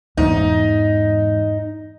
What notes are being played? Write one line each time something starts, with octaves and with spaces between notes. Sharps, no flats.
E2 G#2 D#4